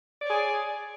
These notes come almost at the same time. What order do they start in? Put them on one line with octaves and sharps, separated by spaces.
D5 C#5 G#4